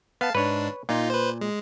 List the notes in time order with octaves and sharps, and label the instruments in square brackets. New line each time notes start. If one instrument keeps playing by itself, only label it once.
[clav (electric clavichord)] B3 [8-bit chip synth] F5 A5
[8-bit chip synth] G#2 D4 [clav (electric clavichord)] B4 C#5
[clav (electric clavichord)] A#2 [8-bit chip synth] D#4 F4
[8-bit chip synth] B4 C5
G#3